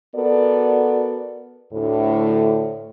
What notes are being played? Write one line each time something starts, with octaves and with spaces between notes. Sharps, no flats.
B3 F#4 A4 A#4 D5
D2 A2